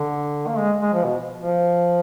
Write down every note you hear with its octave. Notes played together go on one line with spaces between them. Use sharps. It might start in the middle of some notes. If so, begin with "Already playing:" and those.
Already playing: D3
A#3
G#3
G#3
F3
B2
F3